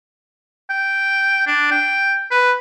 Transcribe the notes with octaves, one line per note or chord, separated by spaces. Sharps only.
G5
D4
G5
B4